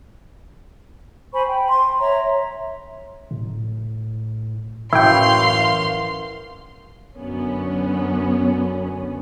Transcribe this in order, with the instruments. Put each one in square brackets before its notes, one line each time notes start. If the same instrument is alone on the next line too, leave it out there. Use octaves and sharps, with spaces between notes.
[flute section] C5 G#5 B5 C#6
G5
C6
C#5 E5 A#5
[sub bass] A2
[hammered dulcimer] F#2 E3 C#6 [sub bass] A2 [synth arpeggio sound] E4 G5 [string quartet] F5 C6
[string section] F#2 D3 B3 C#4